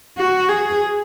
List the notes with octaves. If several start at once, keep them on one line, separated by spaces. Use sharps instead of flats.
F#4
G#4